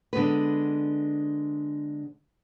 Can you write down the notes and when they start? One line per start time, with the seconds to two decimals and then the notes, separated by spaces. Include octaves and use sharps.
0.13 D3 G#3 B3 B4